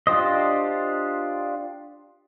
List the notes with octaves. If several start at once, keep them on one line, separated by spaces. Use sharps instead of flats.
D4 F4 G4 C5 D#5